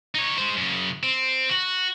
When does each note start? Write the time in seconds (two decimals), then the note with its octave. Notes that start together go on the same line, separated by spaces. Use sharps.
0.15 D#4 C#5
0.38 G#3 C5
0.57 F#2 C#3
1.03 C4
1.50 F#4